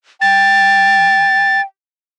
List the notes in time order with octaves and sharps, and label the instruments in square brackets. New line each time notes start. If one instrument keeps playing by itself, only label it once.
[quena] G5 [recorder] A6